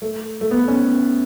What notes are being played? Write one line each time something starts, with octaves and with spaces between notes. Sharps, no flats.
A3
A3
B3
C#4